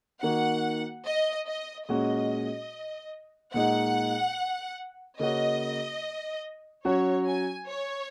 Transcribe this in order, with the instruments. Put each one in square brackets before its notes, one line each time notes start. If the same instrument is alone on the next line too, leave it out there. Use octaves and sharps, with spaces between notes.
[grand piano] D#3 A#3 F#4 [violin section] F#5
[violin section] D#5
D#5
[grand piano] A#2 G#3 C#4 F#4 [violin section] D#5
[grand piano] A#2 G#3 D#4 [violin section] F#5
[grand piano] C#3 A#3 C#4 F#4 [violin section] D#5
[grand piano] F#3 C#4 F#4 [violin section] C#5
[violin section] G#5
C#5